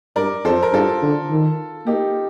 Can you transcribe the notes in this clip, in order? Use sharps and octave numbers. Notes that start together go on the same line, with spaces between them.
G2 A#4 D5
F2 A4 C5
A#4
G2 F4 A4
D3
D#3
A#3 D#4 G4